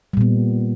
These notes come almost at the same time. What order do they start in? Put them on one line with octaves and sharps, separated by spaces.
G3 A#2 B3